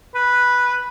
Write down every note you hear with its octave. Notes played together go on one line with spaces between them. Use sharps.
B4